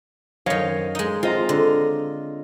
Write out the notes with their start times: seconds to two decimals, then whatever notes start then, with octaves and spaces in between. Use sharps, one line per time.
0.46 F#2 D#3 C#5 D#5 F5
0.95 G#3 D#4
1.23 C4 F4 D#5 A#5
1.49 D3